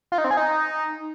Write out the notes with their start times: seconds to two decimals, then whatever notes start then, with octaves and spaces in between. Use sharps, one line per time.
0.12 F4
0.18 D#4
0.24 C4
0.31 G#4
0.37 D#4